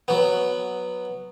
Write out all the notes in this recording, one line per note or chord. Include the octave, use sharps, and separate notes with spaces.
F#3 B3